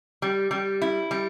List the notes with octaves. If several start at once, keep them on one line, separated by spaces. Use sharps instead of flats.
G3
G3
E4
G3